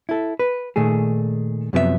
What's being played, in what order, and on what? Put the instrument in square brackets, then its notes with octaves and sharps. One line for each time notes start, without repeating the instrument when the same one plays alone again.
[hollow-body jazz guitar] E4 A4
B4
A#2 D#3 A3 G#4
F#2 C3 F3 B3 F#4 E5